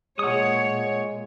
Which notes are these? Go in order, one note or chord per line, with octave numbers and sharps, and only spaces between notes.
A#2 G#3 C#5 F#5 D#6